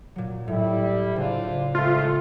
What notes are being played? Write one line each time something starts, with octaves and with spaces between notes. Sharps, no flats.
A#2 F#3
A2 G3 E4
C#3 D4 F4 C5
D#3 G#3 A3 F4